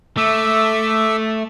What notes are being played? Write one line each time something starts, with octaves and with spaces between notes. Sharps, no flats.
A3 E5 D6 E6